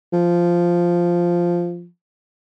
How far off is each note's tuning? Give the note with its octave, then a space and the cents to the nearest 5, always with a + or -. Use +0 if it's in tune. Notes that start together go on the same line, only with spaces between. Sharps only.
F3 -5